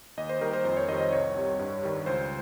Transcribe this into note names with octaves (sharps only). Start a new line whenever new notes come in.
D#2 D#5
C5
D#3 G3 A#4
C5
F2 C5
C#5
D#3 G3 D#5
D#5
C2 C#5
C3 G3
G2
D#3 G3
C#2 C5